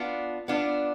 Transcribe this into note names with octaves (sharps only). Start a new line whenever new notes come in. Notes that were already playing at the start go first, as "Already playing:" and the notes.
Already playing: B3 D4 F4
B3 D4 F4